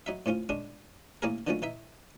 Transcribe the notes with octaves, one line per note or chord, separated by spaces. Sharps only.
F#3 D#4 E5
A2 C4 C#4 F4
G#3 C#4 D4
A1 A#3 C#4 E4 G#4 A#4
D3 D#3 F3 F#3 A3 C#4
E3 D#4 E5